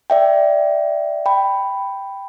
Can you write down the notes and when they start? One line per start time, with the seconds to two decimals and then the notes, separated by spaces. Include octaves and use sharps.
0.10 D5 E5 G5
1.26 G5 B5